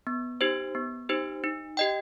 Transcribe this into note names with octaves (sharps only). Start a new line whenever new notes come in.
B3
D#4 G4 C5
B3
D#4 G4 C5
D#4
G4 D#5 G5